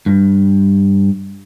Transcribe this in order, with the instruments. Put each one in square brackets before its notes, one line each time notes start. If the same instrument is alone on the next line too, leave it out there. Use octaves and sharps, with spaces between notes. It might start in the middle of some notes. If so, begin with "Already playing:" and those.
[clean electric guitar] G2